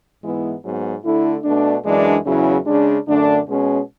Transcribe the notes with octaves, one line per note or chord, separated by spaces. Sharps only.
G#2 E3 G#3 B3 E4
G#2 F#3 B3
D3 A3 E4
B2 A3 D4
F#2 E3 G#3 D4
E2 C#3 F#3 C#4 E4
C#3 G#3 D4
F#2 D3 A3 D4
B2 G#3 C#4